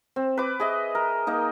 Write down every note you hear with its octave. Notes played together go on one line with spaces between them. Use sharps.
C4
B4 D6
G#4 D#5 E5
A#4
A#3 D#4